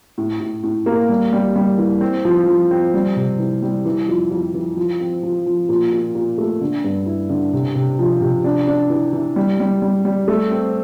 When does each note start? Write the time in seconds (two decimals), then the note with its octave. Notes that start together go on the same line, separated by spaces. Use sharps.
0.18 A2
0.40 A2
0.63 A2
0.86 A#3
1.09 G3
1.33 G3
1.56 G3
1.78 E3
2.01 C4
2.25 F3
2.47 F3
2.71 C4
2.94 G3
3.16 C3
3.39 E3
3.62 G3
3.85 E3
4.08 F2
4.31 F2
4.54 E3
4.77 F3
5.00 C4
5.23 F3
5.46 F3
5.69 A#2
5.92 A#2
6.15 A#2
6.38 A3
6.61 D3
6.84 G2
7.06 E4
7.30 D3
7.53 C3
7.75 C3
7.99 F3
8.21 C3
8.44 D4
8.67 D4
8.90 E3
9.13 E3
9.36 G3
9.60 G3
9.82 G3
10.05 G3
10.28 A3
10.52 C4